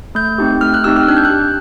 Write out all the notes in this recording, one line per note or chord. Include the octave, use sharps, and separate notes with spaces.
A3 G6
C4 D#4 G4
A3 F6
F#6
C4 D#4 G4 E6
F6
D4 F#6
G6
F#6
G4